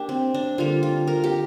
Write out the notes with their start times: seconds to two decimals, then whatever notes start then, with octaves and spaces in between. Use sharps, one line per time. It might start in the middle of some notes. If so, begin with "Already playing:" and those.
Already playing: A#3 D4 G4
0.09 C4
0.34 D4
0.58 D3 G3 A#3 F4
0.83 F4
1.07 A#4
1.24 G4